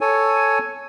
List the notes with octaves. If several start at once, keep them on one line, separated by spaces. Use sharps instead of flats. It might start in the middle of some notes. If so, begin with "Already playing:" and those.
A4 C#5 G#5